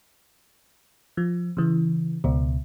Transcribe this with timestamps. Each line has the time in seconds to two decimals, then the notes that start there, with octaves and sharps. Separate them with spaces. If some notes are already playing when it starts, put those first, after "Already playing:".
1.17 F3
1.57 C#3 E3
2.24 C#2 B2